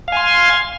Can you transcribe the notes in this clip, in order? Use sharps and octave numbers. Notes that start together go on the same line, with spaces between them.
F5 G#5 C6